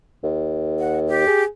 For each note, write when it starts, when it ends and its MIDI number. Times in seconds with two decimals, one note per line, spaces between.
0.23 1.23 39
0.79 0.99 78
1.08 1.43 67
1.27 1.45 68